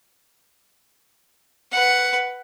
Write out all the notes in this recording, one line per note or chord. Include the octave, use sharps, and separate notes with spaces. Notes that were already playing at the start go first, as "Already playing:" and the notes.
B4 F#5